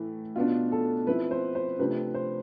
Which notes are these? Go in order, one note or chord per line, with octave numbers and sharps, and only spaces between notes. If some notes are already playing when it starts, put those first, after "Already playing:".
Already playing: A2 E3 A3
B2 B3 D4 F4
A4
F3 C4 E4 B4
C5
C5
C3 F3 A3 D4 B4
C5